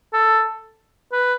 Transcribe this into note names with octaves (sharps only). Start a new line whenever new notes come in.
A4
B4